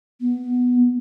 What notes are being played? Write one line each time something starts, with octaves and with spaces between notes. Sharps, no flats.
B3